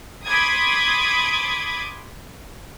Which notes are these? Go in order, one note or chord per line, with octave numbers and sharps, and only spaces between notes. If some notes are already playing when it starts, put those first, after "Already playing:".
A5 B5 C6 D6 D#6 G#6